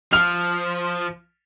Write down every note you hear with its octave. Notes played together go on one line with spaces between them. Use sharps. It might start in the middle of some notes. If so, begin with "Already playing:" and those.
F3 F6 F7